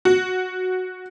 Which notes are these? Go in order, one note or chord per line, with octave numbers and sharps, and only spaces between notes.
F#4